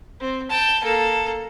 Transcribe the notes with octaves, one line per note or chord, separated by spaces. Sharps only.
C4
G5 A5
A#3 A4